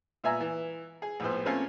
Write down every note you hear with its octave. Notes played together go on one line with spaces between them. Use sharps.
A#2 B3 E5 G#5 A#5
E3
G#4
A#1 A2 B3 C5
A3 A#3 C4 C#4 F4